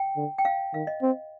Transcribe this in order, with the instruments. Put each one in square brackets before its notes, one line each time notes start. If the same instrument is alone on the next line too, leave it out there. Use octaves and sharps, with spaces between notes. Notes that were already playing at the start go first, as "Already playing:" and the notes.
Already playing: [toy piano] G5
[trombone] D3
[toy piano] G5
F5
[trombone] D#3 [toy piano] F5
[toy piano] D#5
[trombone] C4